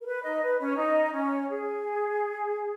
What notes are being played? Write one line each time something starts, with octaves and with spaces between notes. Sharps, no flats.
A#4
B4
D#4 D#5
B4
C#4 C#5
D#4 D#5
D#5
C#4 C#5
G#4